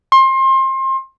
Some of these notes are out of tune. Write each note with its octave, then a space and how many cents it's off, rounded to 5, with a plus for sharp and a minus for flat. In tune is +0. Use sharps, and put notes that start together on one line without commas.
C6 +30